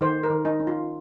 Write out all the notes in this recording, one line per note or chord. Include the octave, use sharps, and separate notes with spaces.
D#3 C5
A#4
D#3
D#4
C#4
F4